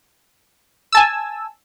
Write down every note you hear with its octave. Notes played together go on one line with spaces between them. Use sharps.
G#5 A5 E6